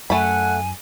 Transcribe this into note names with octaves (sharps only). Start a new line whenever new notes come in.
F#2 A3 F#5 G#5 B5